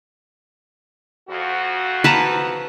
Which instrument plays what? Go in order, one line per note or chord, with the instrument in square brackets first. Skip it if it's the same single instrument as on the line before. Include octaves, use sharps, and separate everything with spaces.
[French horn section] F2 F#4
[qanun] B4 A5 A#5